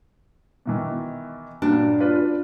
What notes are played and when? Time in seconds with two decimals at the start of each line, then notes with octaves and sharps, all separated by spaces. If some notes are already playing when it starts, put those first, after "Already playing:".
0.66 B2 D#3 E3
1.62 G2 A#2 F#3 D4
2.00 F4 B4 D5